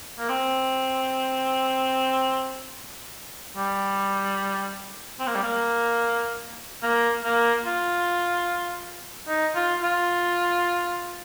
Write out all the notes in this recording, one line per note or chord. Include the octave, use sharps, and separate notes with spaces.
A#3
C4
G3
C4
A#3
G3
A#3
A#3
A#3
F4
D#4
F4
F4